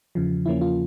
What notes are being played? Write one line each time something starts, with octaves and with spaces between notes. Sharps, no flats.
E2 C#3 F3
E2 C#3 F3 A#3 C#4 E4
F4